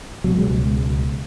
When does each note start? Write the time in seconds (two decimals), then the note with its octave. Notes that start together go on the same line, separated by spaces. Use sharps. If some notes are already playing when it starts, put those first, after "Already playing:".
0.24 C#2 B2 F#3
0.38 G#3